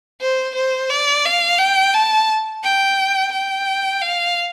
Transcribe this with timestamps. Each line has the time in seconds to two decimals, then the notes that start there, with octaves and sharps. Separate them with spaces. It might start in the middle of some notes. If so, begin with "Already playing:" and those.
0.21 C5
0.55 C5
0.90 D5
1.26 F5
1.59 G5
1.94 A5
2.64 G5
3.33 G5
4.02 F5